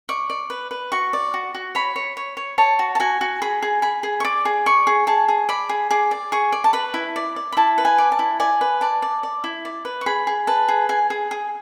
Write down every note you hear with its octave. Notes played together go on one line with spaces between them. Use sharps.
D5 C#6
D5
B4
B4
F#4 C#6
D5
F#4
F#4
C#5 B5
C#5
C#5
C#5
C#5 A5
F#4
A5
F#4 G#5
F#4
G#4 B5
G#4
G#4 B5
G#4
C#6
D5 D6
G#4
D5 C#6
G#4
G#4 A5
G#4
D5 B5
G#4
G#4 D6
D5
G#4 C#6
D5
A5
B4 B5
E4
D5
D5
B5
E4 A5
B4
G#5
D5
A5
E4
D5 G#5
B4
D5 A5
D5
D5
E4
D5
B4
C#6
G#4 B5
G#4
B4 A5
G#4
G#4 G#5
G#4
G#4